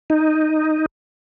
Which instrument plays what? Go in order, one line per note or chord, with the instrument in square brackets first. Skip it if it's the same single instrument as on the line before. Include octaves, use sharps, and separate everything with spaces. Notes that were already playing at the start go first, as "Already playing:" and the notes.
[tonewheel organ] D#4